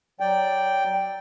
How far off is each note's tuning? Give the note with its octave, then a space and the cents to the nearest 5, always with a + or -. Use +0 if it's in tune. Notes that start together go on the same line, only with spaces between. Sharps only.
F#3 +15 D5 +0 G5 +0